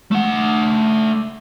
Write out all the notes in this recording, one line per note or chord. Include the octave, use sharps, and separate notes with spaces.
A3 F#5